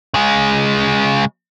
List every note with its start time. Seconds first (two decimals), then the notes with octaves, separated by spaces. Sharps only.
0.14 C#3 G#3